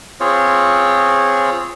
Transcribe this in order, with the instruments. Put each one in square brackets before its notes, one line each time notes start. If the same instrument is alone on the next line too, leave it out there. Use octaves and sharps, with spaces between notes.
[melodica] C4 F4 G#4 C#5